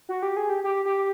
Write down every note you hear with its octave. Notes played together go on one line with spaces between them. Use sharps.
F#4
G4
G#4
G4
G4
G4